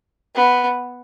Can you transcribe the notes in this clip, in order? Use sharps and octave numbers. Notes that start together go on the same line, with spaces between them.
B3